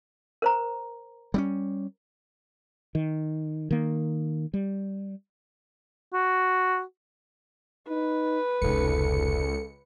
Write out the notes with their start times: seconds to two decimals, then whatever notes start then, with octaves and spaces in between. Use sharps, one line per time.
0.42 A#4 C5 A#5
1.34 G3 C4 C#4
2.95 D#3
3.71 D#3 A#3
4.54 G3
6.14 F#4
7.89 D#4 B4
8.62 F1 C#2 D#4 A4 C#7